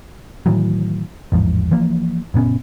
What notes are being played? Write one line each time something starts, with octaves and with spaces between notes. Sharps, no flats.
A2 D#3 E3 F#3
A1 E2 G#2 F3
E3 F3 A#3
F#1 A#2 B3 C#4